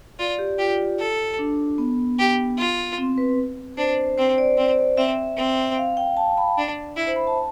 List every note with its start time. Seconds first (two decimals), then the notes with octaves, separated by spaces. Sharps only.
0.19 F4 D5
0.39 G4
0.59 F4 G4
0.99 A4
1.39 D4
1.78 B3
2.19 G4
2.58 F4
2.98 C4
3.18 B4
3.77 D4 C5
4.18 C4 C5
4.38 D5
4.57 C4
4.97 C4 E5
5.37 C4
5.78 F5
5.97 G5
6.17 A5
6.37 B5
6.57 D4
6.97 E4 E5
7.07 C5
7.16 B5
7.27 A5